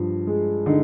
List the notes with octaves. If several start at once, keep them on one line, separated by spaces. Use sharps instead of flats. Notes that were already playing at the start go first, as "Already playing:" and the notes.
Already playing: G2 F3
G#3
D3 D#4